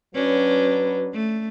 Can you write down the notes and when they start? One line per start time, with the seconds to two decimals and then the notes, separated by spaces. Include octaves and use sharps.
0.15 F#3 C#4 D4 B4
1.14 A3